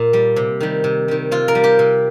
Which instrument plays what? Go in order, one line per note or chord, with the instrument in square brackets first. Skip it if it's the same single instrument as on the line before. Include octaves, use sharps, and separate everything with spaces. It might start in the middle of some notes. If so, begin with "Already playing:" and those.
Already playing: [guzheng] A#2
G3
C3
D#3 G3
C3
D#3 G3
C3 F4
A#4
G3
G4
C3